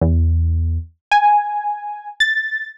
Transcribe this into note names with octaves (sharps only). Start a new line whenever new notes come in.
E2
G#5
A6